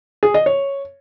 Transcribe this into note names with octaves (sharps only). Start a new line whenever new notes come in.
G#4
D#5
C#5